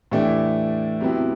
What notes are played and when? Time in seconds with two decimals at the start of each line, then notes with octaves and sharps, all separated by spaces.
0.12 A2 E3 A3 D4 G4
1.01 C3 F#3 B3 E4 G4